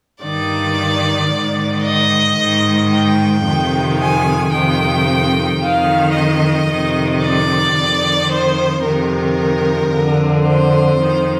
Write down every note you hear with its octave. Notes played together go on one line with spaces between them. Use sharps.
G2 D#3 D5
G#2 D#3
D#5
G#2 D#3
G5
F2 C3 D#3
G#5
F2 C3 D#3 G5
F2 D#3 F5
D#5
F2 C3 D#3
D5
F2 D#3
C5
F2 C3 D#3 A#4
F2 D3
C5
F2 D#3